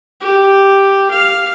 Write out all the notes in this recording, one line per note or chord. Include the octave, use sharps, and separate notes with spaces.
G4
F5